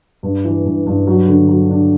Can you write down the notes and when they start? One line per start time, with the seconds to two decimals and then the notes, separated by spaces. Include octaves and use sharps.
0.23 G2
0.45 E3
0.65 G2
0.86 G2
1.07 F#3
1.28 D3
1.48 F#3
1.70 D4